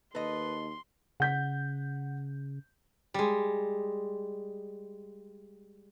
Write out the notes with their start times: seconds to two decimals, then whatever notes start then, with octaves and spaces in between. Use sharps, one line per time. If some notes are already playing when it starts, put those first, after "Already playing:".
0.15 D#2 A4 B4 D#5 C6
1.20 C#3 F#5 G6 B6
3.14 G3 G#3